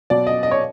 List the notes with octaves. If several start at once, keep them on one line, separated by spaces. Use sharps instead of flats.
B2 F#3 D5
D#5
D#5
C#5